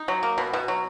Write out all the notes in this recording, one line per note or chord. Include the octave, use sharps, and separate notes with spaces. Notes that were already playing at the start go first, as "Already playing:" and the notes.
Already playing: D#4
F#3
A#3
B2
B2
F#3